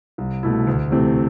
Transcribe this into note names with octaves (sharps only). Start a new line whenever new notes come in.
C2
B2 A3 E4
D2
C3 E3 A3 C4